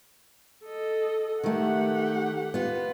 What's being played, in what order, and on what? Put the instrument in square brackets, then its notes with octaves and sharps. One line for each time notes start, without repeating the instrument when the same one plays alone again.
[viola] A4 D#5
[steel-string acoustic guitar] D#3 A3 [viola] G4 F#5
[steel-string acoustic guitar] B3 F4